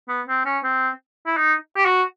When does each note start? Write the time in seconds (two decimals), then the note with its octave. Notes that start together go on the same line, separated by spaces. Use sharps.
0.08 B3
0.28 C4
0.45 C#4
0.64 C4
1.26 E4
1.37 D#4
1.76 G4
1.85 F#4